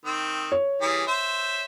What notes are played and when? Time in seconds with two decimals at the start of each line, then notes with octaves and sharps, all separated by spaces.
0.05 D#3 C4
0.52 C#5
0.81 E3 G3 G#4
1.07 C5 E5